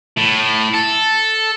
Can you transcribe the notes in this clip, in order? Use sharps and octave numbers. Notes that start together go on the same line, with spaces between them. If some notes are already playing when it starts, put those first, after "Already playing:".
A2
A4